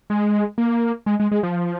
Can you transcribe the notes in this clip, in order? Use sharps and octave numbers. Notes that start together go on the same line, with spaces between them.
G#3
A#3
G#3
G#3
G#3
F3